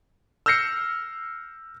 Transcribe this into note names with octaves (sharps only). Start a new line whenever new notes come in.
E6 F6 G6 A#6 C7 C#7